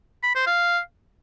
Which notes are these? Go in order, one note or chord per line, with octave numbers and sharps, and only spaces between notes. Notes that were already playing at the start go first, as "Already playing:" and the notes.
B5
C5
F5